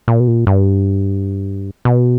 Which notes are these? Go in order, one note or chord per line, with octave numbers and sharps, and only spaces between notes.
A#2
B2
A#2
G2
B2